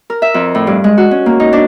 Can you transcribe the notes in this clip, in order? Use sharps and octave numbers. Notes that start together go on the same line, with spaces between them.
A#4
E5
F2
A2
G2
G#3
F#4
C#4
A#3
D#4
D4